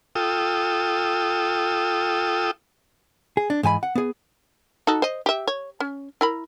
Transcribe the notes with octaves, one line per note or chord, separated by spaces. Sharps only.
F4 A4 G5 D#6 E6
G#4
D4
G#2 E3 G#5 B5
F#5
B3 G#4
D#4 F#4 A4
C5 D#5
G4 E5
C#5
C#4
E4 A#4 B5